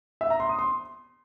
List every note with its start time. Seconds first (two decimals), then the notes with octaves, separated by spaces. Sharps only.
0.21 E5
0.30 A#5
0.40 C6
0.49 D#6
0.59 C6